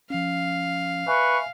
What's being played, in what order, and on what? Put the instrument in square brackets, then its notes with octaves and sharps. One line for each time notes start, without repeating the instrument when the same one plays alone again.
[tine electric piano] F3 C#4 [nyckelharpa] F5
[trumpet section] B4 C#6 [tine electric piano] E5 G#5